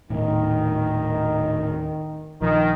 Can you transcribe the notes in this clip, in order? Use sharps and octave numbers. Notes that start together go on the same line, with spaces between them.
D#1 A2 D#3
A#1 D#3 F3